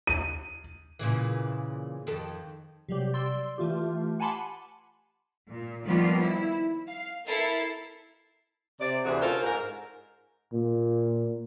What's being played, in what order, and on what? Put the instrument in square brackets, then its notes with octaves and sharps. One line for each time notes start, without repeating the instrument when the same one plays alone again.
[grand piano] D#7
[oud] A#2 C#3 E3
F2 D#3 A4
[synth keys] C3 F#3 G3 G4
D5 C6 E6
E3 A3 F4 G4
F#5 G#5 A5 B5 C6 D6
[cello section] A#2
D#3 F3 G3 A#3 B3 F4
E4
[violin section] F5
E4 A4 A#4 A6 C7 C#7
[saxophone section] C3 D5
D2 C3 E3 D4 F#4 G#4
C#4 F4 A4 A#4 C5
G#2 A#4
[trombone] A#2